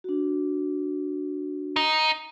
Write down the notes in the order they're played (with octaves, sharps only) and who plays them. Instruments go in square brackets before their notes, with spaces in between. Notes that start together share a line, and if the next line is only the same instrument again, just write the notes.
[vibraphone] D4 F#4
[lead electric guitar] D#4